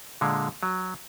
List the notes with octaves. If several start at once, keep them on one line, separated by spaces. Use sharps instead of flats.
A#2 D3 G#3
F#3